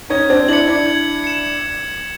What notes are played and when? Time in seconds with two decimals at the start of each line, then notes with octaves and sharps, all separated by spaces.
0.10 C#4 D#4 G#6
0.30 C4 D4
0.48 D4 E4 C#7 F#7
0.67 D4 E4
0.87 G#6
1.24 C#7 E7